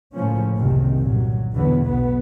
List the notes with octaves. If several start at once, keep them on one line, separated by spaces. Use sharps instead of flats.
A2 C#3 F3 A#3 C#4
F#1 C2 C3 D#3
G1 A#2 F#3
B1 E2 D3 E3 F#3 B3
B1 B2 D3 B3